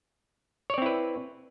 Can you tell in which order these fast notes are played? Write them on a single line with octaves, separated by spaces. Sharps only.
C#5 D5 C4 E4 B4